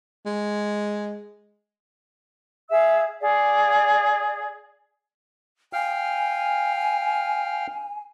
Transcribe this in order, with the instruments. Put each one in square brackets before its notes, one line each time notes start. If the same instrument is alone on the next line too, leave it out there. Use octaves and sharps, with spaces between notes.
[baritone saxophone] G#3
[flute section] G#4 E5 F5 E6
G#4 D5 F5
[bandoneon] F5 G5 F6 [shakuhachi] G#5